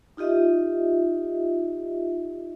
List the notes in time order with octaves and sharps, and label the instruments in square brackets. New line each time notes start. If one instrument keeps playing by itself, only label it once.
[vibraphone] D#4 F4 G4 D#5 E5